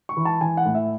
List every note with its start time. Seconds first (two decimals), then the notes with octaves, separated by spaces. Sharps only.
0.09 C#6
0.17 E3
0.25 A5
0.41 E3 G#5
0.57 F#5
0.66 A2
0.75 E5